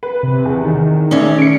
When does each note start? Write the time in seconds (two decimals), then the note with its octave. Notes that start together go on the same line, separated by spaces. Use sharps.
0.03 B4
0.23 C3
0.45 E2
0.64 D#3
1.11 D2 C#4 G#4 D5 E5
1.39 C#7 D7